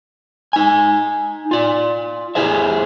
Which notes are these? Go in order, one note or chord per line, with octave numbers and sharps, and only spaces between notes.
D#4 G#5
F4 D5
E4 G4 G#4 C5 E5